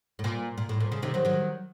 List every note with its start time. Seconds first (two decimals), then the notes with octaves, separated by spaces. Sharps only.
0.19 A2
0.24 A#2
0.58 A#2
0.69 A2
0.80 A#2
0.92 C#3
1.03 C3 D#3
1.14 D#3 F#3
1.25 D#3 F#3